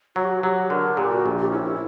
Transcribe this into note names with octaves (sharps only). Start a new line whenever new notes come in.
F#3 F#4
G4
F#4
F#3 G4
D3 A#4
A#2 G4
F#4
A#1
G4
C#4 E4